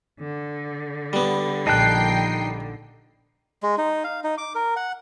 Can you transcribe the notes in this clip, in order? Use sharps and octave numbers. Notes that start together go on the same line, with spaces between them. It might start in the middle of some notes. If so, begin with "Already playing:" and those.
D3
G3 B3
A#1 D#4 G5 A5 F#6 C7
G#3
D#4
F5
D#4
D6
A#4
F#5